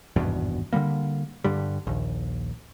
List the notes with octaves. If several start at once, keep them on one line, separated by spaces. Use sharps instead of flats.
G#1 E2 G2 B2
D3 F#3 G3 A#3
G2 D3 G3
A#1 D#2